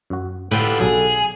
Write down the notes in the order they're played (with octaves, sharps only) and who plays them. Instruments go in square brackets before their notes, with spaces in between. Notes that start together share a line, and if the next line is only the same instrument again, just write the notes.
[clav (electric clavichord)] F#2 F#4
[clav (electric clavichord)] A2 [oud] D3 G4 [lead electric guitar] F4 B4
[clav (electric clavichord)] B1 F#3 [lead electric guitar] G#4